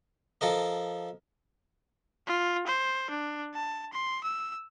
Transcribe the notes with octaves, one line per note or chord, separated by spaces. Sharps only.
F3 A4 A#4 D#5
F4
C5
D4
A5
C6
E6